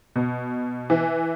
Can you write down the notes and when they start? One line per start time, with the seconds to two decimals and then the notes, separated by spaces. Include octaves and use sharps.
0.16 B2
0.90 E3